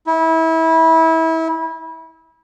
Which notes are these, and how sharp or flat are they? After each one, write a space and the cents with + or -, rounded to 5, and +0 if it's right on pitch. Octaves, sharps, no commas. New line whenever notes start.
E4 -25